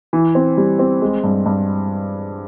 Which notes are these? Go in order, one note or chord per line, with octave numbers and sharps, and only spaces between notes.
E3
C4
G3
C4
G#3
G2
G2